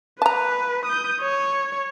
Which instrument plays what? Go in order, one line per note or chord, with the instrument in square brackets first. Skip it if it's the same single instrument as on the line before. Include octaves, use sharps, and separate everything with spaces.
[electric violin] B4 [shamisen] A5 A#5
[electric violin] D#6 G6
C#5